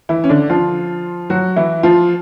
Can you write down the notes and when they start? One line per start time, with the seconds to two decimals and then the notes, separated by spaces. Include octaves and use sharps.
0.09 E3 E4
0.24 C#4
0.29 D3 D4
0.50 F3 F4
1.30 F#3 F#4
1.56 E3 E4
1.83 F3 F4